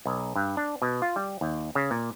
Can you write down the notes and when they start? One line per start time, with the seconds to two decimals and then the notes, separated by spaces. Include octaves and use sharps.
0.05 B1
0.36 G2
0.57 D4
0.82 B2
1.02 F4
1.16 G3
1.41 D#2
1.75 C#3
1.91 A#2